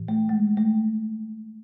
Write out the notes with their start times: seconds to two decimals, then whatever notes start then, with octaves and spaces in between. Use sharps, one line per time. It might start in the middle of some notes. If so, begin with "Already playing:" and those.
Already playing: A2 E3
0.08 A3
0.29 G#3
0.57 A3